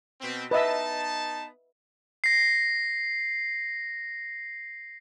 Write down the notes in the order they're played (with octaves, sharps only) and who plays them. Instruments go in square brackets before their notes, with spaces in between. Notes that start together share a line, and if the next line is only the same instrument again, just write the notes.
[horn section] B2 C4
[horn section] B3 D#4 A5 [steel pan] B4 D#5 E5
[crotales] A#6 C7